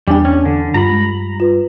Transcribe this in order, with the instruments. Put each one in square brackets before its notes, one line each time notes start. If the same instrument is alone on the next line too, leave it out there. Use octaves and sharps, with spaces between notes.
[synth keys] E2 D4 [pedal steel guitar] G3 [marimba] G5 G#5 D6
[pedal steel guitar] C#4
D3
[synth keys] G2 [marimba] F4 [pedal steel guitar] A#5 B5
[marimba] G#3
F4 B4